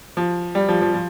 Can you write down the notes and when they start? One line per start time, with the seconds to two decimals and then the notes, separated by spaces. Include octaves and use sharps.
0.17 F3
0.55 G3
0.68 F3
0.81 F3
0.94 F3